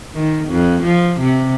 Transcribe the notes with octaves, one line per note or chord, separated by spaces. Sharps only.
D#3
F2
F3
C3